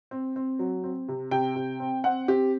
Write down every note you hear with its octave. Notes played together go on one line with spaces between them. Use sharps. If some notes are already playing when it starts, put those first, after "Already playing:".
C4
C4
F#3
C4
C3
C3 G5
C3
C4
C4 F#5
C4 G4